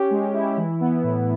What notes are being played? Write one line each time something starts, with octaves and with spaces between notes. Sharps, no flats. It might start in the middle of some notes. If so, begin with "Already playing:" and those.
Already playing: C#4 G4
G#3
E4
E3
B3
A2